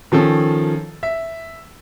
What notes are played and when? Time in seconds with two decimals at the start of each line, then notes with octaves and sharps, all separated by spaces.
0.12 D#3 F3 C#4 A4
1.03 E5